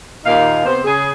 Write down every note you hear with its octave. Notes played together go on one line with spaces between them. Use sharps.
D#2 A#2 A#3 D#4 F5
C3 B3 C5
C#3 G#4